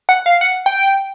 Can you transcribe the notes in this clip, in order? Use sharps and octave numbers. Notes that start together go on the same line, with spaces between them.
F#5
F5
F#5
G5